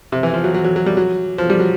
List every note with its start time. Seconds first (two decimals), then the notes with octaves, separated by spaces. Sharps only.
0.12 C3
0.23 E3
0.34 F3
0.44 F#3
0.54 F#3
0.64 F#3
0.76 F#3
0.86 G3
0.97 F#3
1.38 F3
1.50 G3
1.60 F#3